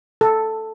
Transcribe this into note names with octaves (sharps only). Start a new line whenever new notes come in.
A4